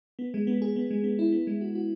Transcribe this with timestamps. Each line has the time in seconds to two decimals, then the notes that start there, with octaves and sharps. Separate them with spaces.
0.19 B3
0.34 G#3
0.47 B3
0.62 G#4
0.76 B3
0.91 G#3
1.04 B3
1.19 E4
1.32 B3
1.47 G#3
1.61 F#4
1.75 F#4